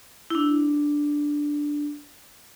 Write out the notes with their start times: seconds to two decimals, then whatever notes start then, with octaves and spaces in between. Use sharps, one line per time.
0.30 E4
0.35 D4